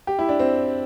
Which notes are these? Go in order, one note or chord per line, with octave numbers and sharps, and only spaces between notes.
G4
E4
D4
C4